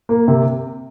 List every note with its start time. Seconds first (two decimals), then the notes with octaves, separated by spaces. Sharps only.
0.09 A#3
0.28 C3